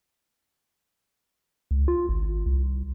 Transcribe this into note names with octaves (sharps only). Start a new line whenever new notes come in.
C#2
F4
G#1
C2